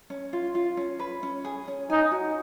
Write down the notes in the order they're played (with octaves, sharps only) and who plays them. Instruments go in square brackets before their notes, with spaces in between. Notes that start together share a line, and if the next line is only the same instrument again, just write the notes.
[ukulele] C#4
F4
F4
C#4
B4
C#4
G#4
C#4
[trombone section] D#4 [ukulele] G#5
[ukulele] F#4